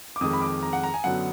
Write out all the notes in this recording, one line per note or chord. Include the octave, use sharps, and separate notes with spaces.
D6
F2 D#3 G#3 D#6
B5
D6
A#5
F#5
A#5
G#5
F#2 D3 F#3 B3 F#5